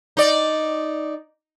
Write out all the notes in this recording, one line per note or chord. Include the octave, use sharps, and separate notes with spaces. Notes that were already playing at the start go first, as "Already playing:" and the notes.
D#4 D5